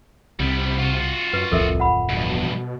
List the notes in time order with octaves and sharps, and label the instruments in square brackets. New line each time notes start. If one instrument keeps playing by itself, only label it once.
[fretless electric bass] C2 [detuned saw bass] C3 [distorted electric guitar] G3 B3
[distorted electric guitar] F4 F#4
[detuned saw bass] F#2 [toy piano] B4
[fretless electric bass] D1 F2 F3 [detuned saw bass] C2 [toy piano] A4 A#4 E5
[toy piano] F#5 B5
[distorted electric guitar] E2 G2 [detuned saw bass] B2